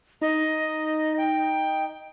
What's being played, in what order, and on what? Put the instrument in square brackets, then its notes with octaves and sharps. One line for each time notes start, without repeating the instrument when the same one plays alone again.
[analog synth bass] D#4 [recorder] D#5
[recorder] G5